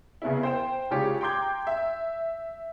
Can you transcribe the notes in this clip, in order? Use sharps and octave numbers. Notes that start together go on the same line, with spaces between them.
C#3 B3 C#4 E4
C5 G5 E7
C#3 G#3 F4 G4 C#5
G5 A#5 C6 D6 G6 G#6
E5